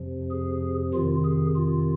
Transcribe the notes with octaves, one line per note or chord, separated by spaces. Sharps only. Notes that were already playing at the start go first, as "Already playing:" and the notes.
Already playing: F2 C3 F3
G#4
F2 C3 D#3 F4
G#4
F4